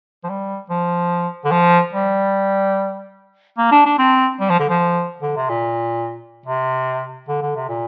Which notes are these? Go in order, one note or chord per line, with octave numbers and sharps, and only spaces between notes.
F3
G3
F3
D3
F3
G3
A#3
D4
D4
C4
G3
F3
D3
F3
D3
C3
A#2
C3
D3
D3
C3
A#2